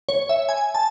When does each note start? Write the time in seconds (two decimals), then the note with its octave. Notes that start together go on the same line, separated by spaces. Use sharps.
0.09 C#5
0.29 E5
0.49 G#5
0.75 A5